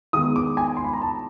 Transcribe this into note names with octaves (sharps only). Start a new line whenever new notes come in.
D#3 G#3 B3 D#6
D6
G#5
C6
B5
A#5
A5